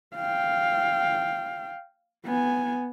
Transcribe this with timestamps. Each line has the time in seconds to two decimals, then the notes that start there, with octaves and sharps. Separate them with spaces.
0.15 F5 G5
2.25 B3 G#5